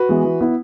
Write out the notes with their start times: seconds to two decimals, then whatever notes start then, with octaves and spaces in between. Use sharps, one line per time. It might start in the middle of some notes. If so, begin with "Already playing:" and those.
Already playing: F#4 B4
0.09 E3 G#3 B3
0.24 E3
0.41 B3 E4